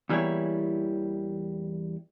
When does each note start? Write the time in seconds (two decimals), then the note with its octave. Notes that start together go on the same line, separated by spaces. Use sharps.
0.09 E2 E3 G3 A#3 E4 C#5